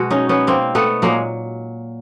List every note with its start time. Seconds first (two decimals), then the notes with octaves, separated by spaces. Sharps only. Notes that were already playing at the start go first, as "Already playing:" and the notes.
Already playing: B2 G#3 F#4
0.10 C#4 D#4
0.29 B3 C#4
0.47 A#3 C4
0.75 A3 B3
1.02 A#2 F#3 G#3 A#3